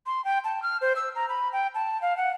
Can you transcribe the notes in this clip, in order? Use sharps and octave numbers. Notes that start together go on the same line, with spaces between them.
C6
G5
A5
F6
C5
E6
A#5
B5
G5
A5
F5
F#5